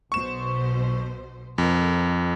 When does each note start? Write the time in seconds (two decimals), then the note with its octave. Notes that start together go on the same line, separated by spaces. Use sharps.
0.12 B1 B2 C5 C#6 E7
1.58 F2 A#4